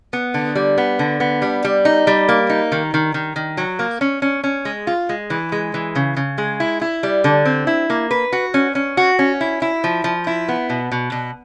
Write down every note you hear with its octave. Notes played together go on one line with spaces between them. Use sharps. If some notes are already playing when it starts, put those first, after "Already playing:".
B3
D3
G3
B3
D3
B3
G3
G3
D#4
G3
A#3
D#4
D#3
D#3
D#3
D#3
F#3
A#3
C#4
C#4
C#4
G#3
F4
G#3
E3
G#3
E3
C#3
C#3
G#3
E4
E4
G3
D3
C4
E4
A#3
B4
F#4
C#4
C#4
F#4
C#4
E4
E4
F3
F3
E4
B3
B2
B2
B2